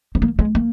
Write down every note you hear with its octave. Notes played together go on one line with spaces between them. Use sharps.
C4
A#3
G#3
A#3